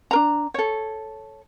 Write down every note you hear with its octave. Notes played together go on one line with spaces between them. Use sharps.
D4 A#4 A#5
A4 C#5